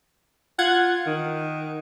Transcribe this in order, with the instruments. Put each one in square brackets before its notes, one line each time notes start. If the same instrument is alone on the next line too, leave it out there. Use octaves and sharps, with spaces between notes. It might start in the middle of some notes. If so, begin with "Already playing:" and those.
[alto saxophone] F4 [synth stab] F#5 G#6
[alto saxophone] D#3